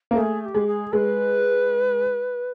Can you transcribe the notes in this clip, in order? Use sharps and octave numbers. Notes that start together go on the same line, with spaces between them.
A#3
A3 G#4
G#4
G4
G#3
G#4
G#3 B4